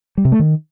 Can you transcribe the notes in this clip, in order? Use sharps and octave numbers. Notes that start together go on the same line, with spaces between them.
G3
C3
A3
D#3